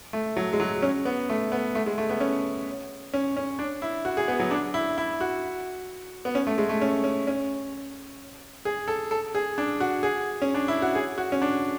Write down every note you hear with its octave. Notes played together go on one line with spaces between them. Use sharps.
A3
F#3
G#3
F#3
C#4
B3
A3
B3
A3
G#3
A3
B3
C#4
C#4
C#4
D4
E4
F#4
G#4
B3
F#3
D4
E4
E4
F#4
B3
C#4
A3
G#3
A3
C#4
C#4
C#4
G#4
A4
A4
G#4
D4
F#4
G#4
C#4
D4
E4
F#4
G#4
F#4
C#4
D4